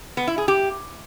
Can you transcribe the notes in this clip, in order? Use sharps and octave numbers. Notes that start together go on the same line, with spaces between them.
B3
E4
G#4
G4